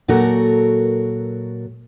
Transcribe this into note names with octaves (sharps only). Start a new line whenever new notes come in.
A#2 F#3 F#4 A4 A#4